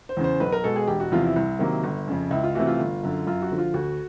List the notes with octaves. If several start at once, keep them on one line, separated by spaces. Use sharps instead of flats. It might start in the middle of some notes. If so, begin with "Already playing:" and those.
C5
E2 C#3
C5
B1 B4
A#4
B2 G#3 A4
G#4
E1 G4
F#4
E2 C3 F3 F4
E4
C2
C3 D#3 F#3 A#3
G1
F2 C#3
C#2 E4
F4
C3 E3 A3 F#4
F4
G1
F#2 D3
F#2 F4
F#4
D3 F3
F4
D2 F#4